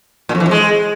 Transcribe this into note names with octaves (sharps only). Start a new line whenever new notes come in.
A#2
F2
E3
F2
G#3